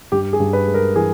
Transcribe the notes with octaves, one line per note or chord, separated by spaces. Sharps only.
G2 G4
G#4
G2
B4
G#3
A#4
E3 G#4